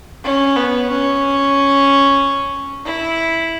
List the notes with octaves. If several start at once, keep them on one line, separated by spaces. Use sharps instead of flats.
C#4
B3
C#4
E4